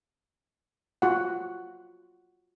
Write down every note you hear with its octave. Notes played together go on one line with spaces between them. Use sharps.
F4 F#4 F#5